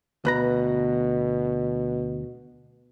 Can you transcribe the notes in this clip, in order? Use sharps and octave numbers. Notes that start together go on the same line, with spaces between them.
D2 B2 B4 A#5